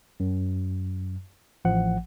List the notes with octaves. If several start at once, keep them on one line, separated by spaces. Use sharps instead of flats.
F#2
A1 F3 F#5